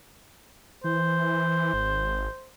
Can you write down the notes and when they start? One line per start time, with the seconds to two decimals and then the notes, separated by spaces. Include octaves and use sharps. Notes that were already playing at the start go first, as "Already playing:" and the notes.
0.84 E3 C5
1.74 G#1